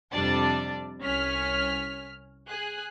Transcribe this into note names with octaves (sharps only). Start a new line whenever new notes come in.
F2 C3 G3 D4 D5 A5
C2 C#4 F6 B6
G#4 F#6